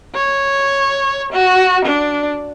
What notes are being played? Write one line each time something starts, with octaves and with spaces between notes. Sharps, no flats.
C#5
F#4
D4